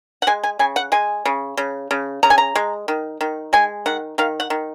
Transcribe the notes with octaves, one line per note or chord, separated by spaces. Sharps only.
F#5
G#3 G#5
G#5
C#3 G#5
F#5
G#3 G#5
C#3
C#3
C#3
C#3 A#5
G#5
A#5
G#3
D#3
D#3
G#3 G#5
D#3 F#5
D#3 F5
F#5
D#3